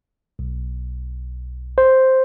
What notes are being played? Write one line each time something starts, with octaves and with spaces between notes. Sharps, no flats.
B1
C5